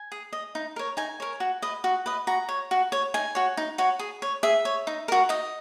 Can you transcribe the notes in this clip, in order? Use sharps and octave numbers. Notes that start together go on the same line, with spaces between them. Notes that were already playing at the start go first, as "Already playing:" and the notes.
Already playing: G#5
G#4
D#5
D#4
A#4 C#5
D#4 G#5
A#4 C#5
F#4
B4 D#5
F#4
B4 D#5
F#4 A#5
C#5
F#4
C#5
D#4 G#5
F#4 C#5
D#4
F#4 C#5
G#4
C#5
G#4 E5
C#5
D#4
F#4 A#4
D#4 D#5